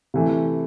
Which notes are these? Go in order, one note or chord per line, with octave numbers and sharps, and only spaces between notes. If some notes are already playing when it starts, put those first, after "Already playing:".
C3 E3 A3